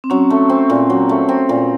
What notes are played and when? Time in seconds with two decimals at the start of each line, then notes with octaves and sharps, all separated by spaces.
0.04 C4
0.10 F#3 C#4
0.30 A3
0.50 C4
0.70 A#2
0.90 F#3
1.09 A3
1.29 C4
1.49 A#2